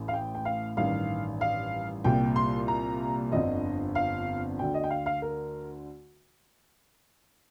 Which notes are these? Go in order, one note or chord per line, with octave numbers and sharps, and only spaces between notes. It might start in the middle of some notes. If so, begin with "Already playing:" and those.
Already playing: A1 A2
F5
G5
G5
F5
A1 G2 D#3 F5
F5
C2 A#2 G5
C6
A#5
G1 F2 D3 D#5
F5
D2 D3 G5
D#5
G5
F5
F5
A#4